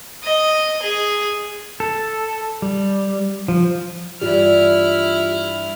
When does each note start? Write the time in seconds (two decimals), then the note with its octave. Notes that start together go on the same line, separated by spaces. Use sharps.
0.24 D#5
0.82 G#4
1.80 A4
2.62 G3
3.48 F3
4.21 G2 E3 E4 F4 G4 D5 F6